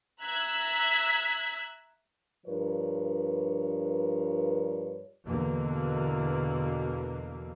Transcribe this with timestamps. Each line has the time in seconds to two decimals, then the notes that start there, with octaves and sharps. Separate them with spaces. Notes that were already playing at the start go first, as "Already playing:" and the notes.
0.22 E5 A#5 E6 F#6 G#6 B6
2.47 G2 F3 D4 A#4 B4 C#5
5.26 E2 B2 D3 A#3